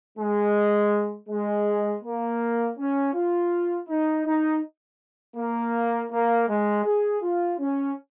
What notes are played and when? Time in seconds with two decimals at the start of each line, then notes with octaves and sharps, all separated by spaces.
0.18 G#3
1.29 G#3
2.03 A#3
2.78 C#4
3.14 F4
3.88 D#4
4.26 D#4
5.37 A#3
6.11 A#3
6.48 G#3
6.85 G#4
7.22 F4
7.59 C#4